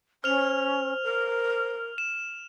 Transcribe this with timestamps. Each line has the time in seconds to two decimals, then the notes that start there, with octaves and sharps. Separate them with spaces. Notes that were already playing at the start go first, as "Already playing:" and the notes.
0.24 C#4 C5 F6 F7
1.03 A#4
1.98 E7